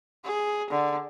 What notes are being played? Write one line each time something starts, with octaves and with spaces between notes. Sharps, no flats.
G#4
D3